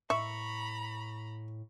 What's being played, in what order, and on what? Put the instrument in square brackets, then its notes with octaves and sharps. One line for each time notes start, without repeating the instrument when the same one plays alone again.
[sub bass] A2 [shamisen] E5 [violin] A#5 B5 [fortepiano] C#6